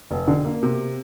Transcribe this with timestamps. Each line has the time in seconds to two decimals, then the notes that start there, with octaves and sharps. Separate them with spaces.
0.11 F1
0.28 D3
0.45 A#3
0.63 C3